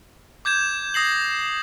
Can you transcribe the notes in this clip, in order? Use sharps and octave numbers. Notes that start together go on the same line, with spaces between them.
D6 G6 G#6 E7
D#6 A#6 C7 F#7